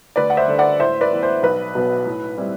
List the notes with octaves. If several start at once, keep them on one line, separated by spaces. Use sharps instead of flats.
D2 B4 D5
F#5
C5 E5
D3 A3 D4
D5 F#5
A2 C5 E5
B4 D5
E3 B3
C5
B1 B4
B2 F#3 B3
A2
G3 C4 E4